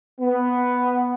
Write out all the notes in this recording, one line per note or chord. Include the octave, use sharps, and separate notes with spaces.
B3